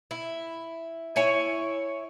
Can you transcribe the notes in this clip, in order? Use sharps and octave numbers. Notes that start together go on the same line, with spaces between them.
E4
E4 C#5 G#5